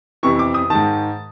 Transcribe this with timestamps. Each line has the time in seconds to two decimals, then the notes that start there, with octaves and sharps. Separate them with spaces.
0.23 F2 C3 E3 C#6
0.39 D6
0.54 D#6
0.70 G#2 D#3 A5